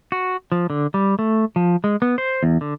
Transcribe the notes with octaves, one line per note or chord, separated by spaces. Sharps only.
F#4
F3
D3
G3
A3
F3
G#3
B3
C5
E2
D3